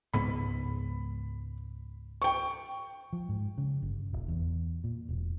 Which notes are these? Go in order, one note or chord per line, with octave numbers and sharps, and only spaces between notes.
C#2 G#2 B3 B5
G5 C#6
F3
G#2
C#3
G1
D#1
E2
A#2
E1